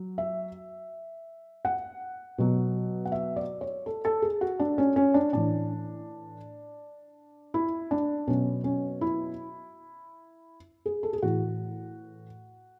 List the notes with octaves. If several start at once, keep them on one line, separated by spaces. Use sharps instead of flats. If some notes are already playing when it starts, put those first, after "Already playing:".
Already playing: F#3
E5
F#5
B2 F#3
F#5
E5
D5
C#5
A4
A4
G#4
F#4
D4
C#4
C#4
D4
A2 E3 D4
E4
D4
B2 F#3 C#4
C#4
E4
G#4
A4
G#4
A2 E3 F#4